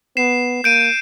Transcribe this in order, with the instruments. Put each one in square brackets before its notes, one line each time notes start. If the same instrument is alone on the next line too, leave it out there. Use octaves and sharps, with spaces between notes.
[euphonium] B3 [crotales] C7 E7
[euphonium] A#3 [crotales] G6 D7 D#7